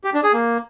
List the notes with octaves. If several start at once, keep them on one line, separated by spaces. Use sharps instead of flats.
G4
D4
G#4
A#3